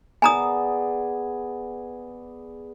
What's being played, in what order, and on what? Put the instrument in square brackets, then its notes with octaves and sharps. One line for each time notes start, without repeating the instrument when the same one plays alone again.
[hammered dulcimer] B3 G#4 D5 [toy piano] G#5 A#5 D#6